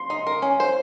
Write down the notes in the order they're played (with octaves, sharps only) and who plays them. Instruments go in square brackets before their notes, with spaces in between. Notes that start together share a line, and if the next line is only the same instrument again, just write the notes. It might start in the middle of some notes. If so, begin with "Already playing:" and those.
Already playing: [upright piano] C6
[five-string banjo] D#4
A#4
C#4
C5